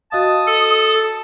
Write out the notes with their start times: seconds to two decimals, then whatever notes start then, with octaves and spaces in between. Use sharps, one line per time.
0.12 F#4 D#5 F5 A5 D#6
0.47 A4